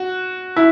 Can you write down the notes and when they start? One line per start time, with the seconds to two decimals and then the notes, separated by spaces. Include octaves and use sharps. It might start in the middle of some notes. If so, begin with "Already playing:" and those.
Already playing: F#4
0.56 E4